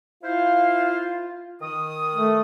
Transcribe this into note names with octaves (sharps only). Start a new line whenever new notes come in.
E4 F4 C5 F5
D#3 D#6
A3